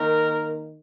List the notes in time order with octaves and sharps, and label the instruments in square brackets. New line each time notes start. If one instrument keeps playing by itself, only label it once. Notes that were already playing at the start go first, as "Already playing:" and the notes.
Already playing: [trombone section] D#3 A#3 A#4